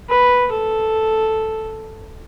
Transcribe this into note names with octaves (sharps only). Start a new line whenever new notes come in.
B4
A4